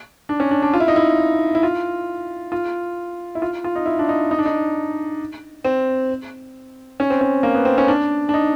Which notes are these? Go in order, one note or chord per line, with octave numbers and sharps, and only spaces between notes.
D4
C#4
D4
D4
F4
E4
D#4
E4
E4
F4
F4
E4
F4
F4
D#4
E4
D4
D#4
D#4
D4
D#4
C4
C#4
C4
C#4
A#3
B3
C4
C#4
D4
D4
D#4